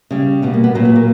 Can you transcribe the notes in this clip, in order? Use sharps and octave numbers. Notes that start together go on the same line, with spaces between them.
C#3 G3
B2 G3 B3
A#3
B3
A#2 F#3 A#3
A#3
A#3